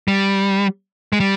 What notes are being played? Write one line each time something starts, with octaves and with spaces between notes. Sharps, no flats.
G3
G#3
G3